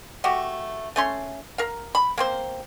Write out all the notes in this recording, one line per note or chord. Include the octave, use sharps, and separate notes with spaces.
A3 F#4 G4
A3 C#4 C6
A#4 F5
B5
A#3 C4 C5